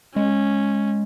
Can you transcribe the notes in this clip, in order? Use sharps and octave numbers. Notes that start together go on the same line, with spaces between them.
G#3 C#4